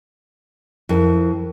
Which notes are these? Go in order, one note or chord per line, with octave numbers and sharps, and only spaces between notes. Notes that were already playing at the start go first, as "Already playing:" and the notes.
F2 E4 A#4